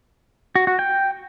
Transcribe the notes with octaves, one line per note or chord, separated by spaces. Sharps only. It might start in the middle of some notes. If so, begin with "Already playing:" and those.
F#4
F#4
G5